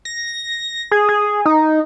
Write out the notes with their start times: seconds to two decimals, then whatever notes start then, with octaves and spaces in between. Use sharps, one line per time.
0.05 A#6
0.92 G#4
1.09 G#4
1.45 D#4